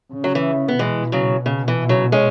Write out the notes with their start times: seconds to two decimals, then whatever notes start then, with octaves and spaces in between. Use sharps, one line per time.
0.13 C#3
0.24 F#3
0.35 E3
0.68 B3
0.79 B2 E3 G#3
1.12 C#3 F#3
1.46 C#3
1.68 E3
1.89 C#3 F#3
2.12 G#3 C#4